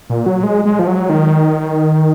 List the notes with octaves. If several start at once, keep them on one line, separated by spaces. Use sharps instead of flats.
A#2
F#3
G#3
G#3
F3
F#3
D#3